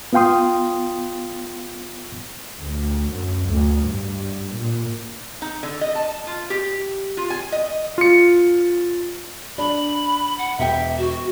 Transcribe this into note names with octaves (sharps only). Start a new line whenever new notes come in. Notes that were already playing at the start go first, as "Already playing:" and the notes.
B3 F4 F5 G5 C6 D#6
D2
F#2
D2
G2
A#2
D#4
D3
D#5
A5
F4
G4
F4
G#5
D#5
F4 C#7
D4 B5
F#5
E1 E5 G5
F#4